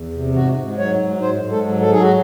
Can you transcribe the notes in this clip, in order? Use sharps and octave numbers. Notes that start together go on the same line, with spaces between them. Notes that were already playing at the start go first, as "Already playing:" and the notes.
Already playing: E2
C3
G#2 F#4
G#2
F#3 C#5
G#2
G#2 C5
G#2
A4
F#3
A4
F#3 G#4
F#4